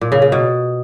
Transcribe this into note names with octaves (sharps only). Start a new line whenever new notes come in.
A#2
C#3
C#3
B2